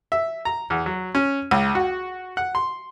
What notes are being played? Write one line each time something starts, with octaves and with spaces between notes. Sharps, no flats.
E5
A#5
E2
F#3
C#4
C#2
F#4
F#5
C6